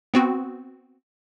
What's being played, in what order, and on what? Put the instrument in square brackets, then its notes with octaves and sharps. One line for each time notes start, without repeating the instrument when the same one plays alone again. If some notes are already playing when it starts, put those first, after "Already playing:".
[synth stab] B3 C4 F#4